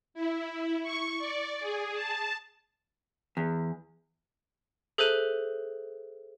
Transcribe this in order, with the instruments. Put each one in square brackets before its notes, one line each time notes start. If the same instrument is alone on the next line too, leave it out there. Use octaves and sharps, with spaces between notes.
[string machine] E4
C#6
D5
G#4
A5
[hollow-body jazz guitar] E2
[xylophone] G#4 A4 C5 E5 F#6 D#7